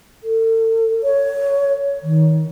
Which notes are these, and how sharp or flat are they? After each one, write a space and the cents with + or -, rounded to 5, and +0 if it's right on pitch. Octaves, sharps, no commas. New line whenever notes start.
A4 +40
C#5 +15
D#3 +25